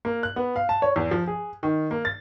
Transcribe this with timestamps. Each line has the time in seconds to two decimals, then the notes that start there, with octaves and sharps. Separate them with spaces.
0.05 A#3
0.23 F#6
0.36 B3
0.56 F5
0.69 A5
0.82 C#5
0.96 E2
1.11 F3
1.27 G#4
1.63 D#3
1.91 A#3
2.05 A6